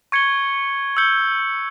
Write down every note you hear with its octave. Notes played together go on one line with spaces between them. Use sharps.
C#6 G#6 C#7 G7
E6 G6 C#7 G7